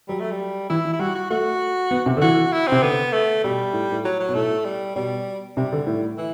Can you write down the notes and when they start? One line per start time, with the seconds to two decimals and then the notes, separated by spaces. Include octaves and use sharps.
0.08 F#3 G3
0.20 A3
0.32 G3
0.70 E3 E4
0.85 E3
0.93 E4
0.99 G3 F#4
1.15 F#4
1.30 A3 F#4
1.91 B3
2.06 C3
2.17 D3
2.22 E3 F#4
2.52 E4
2.67 C3 C4
2.82 D3 B3
3.13 A3
3.44 B2 G3
3.73 A2
3.92 A2
4.05 F#3
4.20 F#3
4.29 B2
4.35 A2 A3
4.65 G3
4.96 B2 G3
5.57 C3 G3
5.72 D3
5.87 A2
6.17 E3